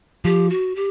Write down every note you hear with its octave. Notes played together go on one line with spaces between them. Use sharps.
F3 G4
F#4
G4